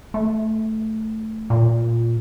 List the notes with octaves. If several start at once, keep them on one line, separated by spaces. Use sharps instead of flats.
A3
A#2